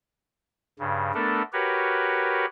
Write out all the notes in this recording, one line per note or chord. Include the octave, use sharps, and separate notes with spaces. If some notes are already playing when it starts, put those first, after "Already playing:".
G2 C#3
A3 B3 D4 A4 A#4
F#4 G4 A#4 B4 C#5